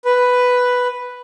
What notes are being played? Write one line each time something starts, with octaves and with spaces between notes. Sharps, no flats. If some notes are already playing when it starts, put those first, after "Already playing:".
B4